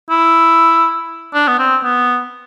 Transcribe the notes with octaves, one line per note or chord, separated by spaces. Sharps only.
E4
D4
B3
C4
B3